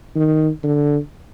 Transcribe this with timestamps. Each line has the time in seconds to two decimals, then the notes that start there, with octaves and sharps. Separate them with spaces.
0.16 D#3
0.63 D3